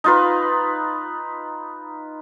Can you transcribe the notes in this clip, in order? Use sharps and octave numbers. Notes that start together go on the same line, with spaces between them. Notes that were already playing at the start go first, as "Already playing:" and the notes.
D#4 F4 B4